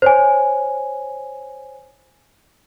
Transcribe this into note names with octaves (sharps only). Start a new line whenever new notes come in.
C5 C#5 G#5